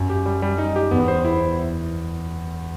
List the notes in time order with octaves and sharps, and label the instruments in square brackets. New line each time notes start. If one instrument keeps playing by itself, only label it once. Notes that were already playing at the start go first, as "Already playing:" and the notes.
Already playing: [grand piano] F#2
[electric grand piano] G4
G3
G3
D#4
G4
[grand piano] E2 [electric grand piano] B3
[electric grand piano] C5
E4